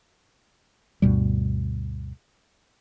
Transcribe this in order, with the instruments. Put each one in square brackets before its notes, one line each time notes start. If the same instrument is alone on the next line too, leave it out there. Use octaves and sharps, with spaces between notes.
[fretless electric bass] D2 G2 B2 G3